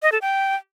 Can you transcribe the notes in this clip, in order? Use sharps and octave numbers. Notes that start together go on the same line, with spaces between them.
D#5
A4
G5